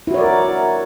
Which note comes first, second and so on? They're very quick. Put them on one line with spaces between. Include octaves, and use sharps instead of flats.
E4 F#4 C#5 D5 A#4